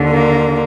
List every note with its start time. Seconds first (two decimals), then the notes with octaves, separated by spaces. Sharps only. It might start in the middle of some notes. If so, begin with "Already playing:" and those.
Already playing: D#2 D3
0.10 A#3